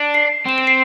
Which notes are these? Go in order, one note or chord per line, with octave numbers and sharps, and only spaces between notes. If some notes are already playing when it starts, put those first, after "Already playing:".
Already playing: D4
C7
C4 E7
D7
C7